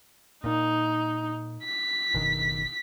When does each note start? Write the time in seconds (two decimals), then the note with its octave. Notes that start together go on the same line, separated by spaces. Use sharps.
0.44 A#2 D#4
1.65 B6
2.14 F#1 B2 D#3